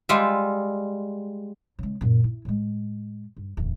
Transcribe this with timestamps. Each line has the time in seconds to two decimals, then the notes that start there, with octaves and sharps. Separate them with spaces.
0.09 G3 G#3 F4 E5
1.79 C#3 G#3
2.01 F#2 A#2
2.24 E4
2.45 A2 G#3
3.37 G2
3.57 D1 E2